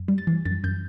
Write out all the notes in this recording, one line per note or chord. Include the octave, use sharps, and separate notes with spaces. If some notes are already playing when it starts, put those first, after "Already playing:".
Already playing: F#2
G3
A6
E3
F#2 A6
F#2 G6